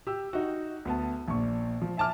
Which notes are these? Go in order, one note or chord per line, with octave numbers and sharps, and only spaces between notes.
G4 E6
D#4 F#4
D2 B3 A5
A#1 A#2 C#6
F3
E5 G#5 A5 D6 F6